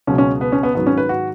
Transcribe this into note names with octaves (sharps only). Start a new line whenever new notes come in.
C#2 B2 F#3 C#4
C#4
B3
C#4
B3
G#2 D#3 F#3 B3
C#4
B4
F#4